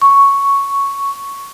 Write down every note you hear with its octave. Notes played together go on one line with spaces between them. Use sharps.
C#6